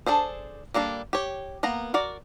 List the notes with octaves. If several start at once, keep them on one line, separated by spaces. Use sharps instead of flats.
D4 G#4 A4 C5
G3 A#3 D4 A4
G4 C#5
A#3 B3 A#5
F#4 A#4 D5